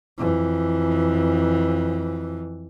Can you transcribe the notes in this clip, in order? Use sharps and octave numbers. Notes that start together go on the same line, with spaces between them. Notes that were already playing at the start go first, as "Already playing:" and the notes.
F2 E3